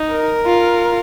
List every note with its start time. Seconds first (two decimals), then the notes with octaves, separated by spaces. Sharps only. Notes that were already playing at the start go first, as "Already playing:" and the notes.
Already playing: D#4
0.11 A#4
0.46 F4